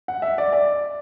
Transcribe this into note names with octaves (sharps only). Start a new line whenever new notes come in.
F#5
E5
D5
D5